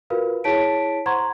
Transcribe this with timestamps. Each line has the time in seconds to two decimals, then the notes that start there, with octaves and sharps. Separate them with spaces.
0.10 F4 F#4 A#4 B4 F5
0.44 E4 G#4 C#5 A5 B6 D7
1.06 C5 F#5 A#5 C6 C#6 G#6